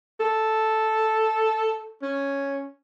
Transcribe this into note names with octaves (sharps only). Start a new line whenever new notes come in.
A4
C#4